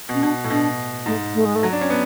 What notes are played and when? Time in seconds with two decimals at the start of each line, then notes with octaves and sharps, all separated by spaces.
0.09 B2
0.14 C#4
0.22 B2 D4
0.44 A2
0.50 B2 D4
1.06 G#2 A3
1.35 A3
1.45 G#3
1.55 A3
1.63 F#3
1.72 D4
1.81 C#4
1.90 B3